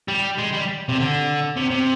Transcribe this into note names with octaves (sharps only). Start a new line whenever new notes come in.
G3
G#3
G3
C3
D3
C3
C3